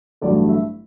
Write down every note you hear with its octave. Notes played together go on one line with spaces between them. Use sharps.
A1 G2 D3 F#3 A3 D5
E5